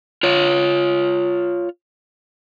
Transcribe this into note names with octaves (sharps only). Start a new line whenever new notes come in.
F4 C#5